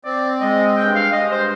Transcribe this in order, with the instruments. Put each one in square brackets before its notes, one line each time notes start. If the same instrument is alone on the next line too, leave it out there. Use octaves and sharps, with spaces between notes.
[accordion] C4 [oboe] D5
[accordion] G#3 [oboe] D#5
[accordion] G2 [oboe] G5
[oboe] F5
[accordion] G#3 [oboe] D#5
[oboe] C5